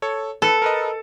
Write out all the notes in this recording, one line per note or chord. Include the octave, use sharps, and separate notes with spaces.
A4 C#5
A4 B4
A#4 B4 D#5